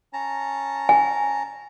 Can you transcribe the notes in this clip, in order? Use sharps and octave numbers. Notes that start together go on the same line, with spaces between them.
C#4 A5 A#5
G#5